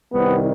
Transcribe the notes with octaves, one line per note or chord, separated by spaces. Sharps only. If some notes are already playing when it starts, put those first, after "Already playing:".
C2 C3 D#3 G3 B3